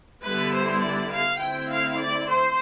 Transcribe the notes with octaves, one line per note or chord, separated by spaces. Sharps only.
D3 G3 B3 E4 B4
C5
D5
F5
D3 A3 C4 E4 G5
F5
D5
C5